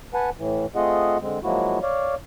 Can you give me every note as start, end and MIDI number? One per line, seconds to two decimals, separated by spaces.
0.14 0.30 71
0.14 0.30 78
0.14 0.30 80
0.14 0.30 81
0.37 0.66 45
0.37 0.66 52
0.76 1.17 57
0.76 1.17 60
0.76 1.17 65
0.76 1.17 68
0.76 1.17 75
0.76 1.17 78
1.21 1.39 50
1.21 1.39 56
1.21 1.39 60
1.44 1.79 53
1.44 1.79 54
1.44 1.79 56
1.44 1.79 58
1.44 1.79 64
1.44 1.79 66
1.82 2.15 73
1.82 2.15 74
1.82 2.15 77